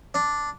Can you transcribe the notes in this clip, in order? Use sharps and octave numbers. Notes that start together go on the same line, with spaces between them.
D4